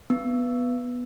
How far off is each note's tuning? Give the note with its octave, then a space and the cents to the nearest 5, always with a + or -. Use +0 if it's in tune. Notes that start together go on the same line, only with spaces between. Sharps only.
B3 +0